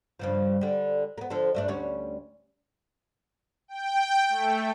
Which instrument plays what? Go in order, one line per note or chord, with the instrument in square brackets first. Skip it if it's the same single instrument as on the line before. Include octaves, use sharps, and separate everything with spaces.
[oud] G2 C#3 F3
D3 G3
A#3 B3
D3 F3 A4
G2 A3 D4
D2 G3 C#4
[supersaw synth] G5
A3